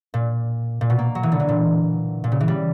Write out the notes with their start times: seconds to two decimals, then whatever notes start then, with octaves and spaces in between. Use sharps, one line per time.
0.14 A#2
0.81 A#2
0.90 B2
0.99 A#3
1.15 F#3
1.23 E3
1.32 D3
1.40 E3
1.48 A#2
2.24 A#2
2.32 C#3
2.40 E3
2.48 G3